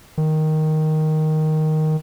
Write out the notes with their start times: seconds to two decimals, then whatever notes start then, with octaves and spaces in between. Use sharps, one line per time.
0.18 D#3